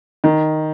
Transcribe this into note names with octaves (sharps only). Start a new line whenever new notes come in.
D#3